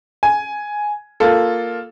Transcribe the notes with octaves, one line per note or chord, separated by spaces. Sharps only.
G#5
A#3 F4 A4